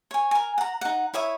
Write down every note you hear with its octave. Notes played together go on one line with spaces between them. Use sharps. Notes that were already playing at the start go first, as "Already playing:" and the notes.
C#5 G#5
A#4 G#5
F#5 A#5
D#4 F#5
E4 C#5 E5 D#6